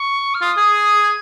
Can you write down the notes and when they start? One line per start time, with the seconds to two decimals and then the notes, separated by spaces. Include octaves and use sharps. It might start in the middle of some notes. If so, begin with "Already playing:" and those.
Already playing: C#6
0.34 F6
0.41 F4 D#6
0.57 G#4
1.03 G#6